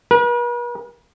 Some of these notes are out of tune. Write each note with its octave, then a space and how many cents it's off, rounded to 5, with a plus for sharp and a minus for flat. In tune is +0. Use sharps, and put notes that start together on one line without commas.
B4 -45